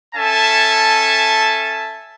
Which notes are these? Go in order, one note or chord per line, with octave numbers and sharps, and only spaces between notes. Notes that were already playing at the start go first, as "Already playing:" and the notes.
C#4 A4 E5 G#5 A5